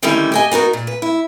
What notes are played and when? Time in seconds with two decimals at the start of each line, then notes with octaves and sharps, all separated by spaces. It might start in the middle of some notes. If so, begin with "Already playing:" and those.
0.02 D3 D#3 G3 A3 C#4 E4
0.32 G4 D#5 G#5
0.51 B3 D#4 F#4 A#4
0.73 A#2
0.87 B4
1.02 E4